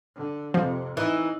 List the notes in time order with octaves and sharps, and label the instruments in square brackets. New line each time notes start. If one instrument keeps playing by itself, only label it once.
[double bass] D3
[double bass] F2 C3 [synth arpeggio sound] F3
[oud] E3 [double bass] D#4